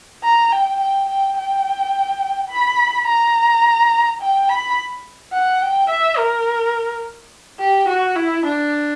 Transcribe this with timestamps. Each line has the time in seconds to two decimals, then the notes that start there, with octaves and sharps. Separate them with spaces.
0.24 A#5
0.52 G5
0.80 G5
1.09 G5
1.37 G5
2.50 B5
3.07 A#5
4.21 G5
4.49 B5
5.33 F#5
5.62 G5
5.90 E5
6.18 A#4
7.60 G4
7.89 F#4
8.16 E4
8.46 D4